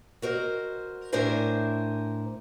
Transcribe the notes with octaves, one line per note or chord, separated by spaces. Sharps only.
F#4 A#4 C5 D#5
A2 D4 E4 A#4 C5 G#5